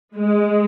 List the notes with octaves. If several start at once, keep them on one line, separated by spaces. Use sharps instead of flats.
G#3